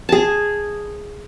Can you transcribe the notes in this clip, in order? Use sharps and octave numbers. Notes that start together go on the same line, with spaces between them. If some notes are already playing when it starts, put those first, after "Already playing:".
G#4 A5